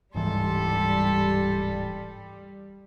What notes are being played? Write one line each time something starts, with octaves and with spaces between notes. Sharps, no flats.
D1 G#2 E3 G3 A4 C6